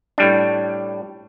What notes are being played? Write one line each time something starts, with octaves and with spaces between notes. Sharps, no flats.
A2 G3 D4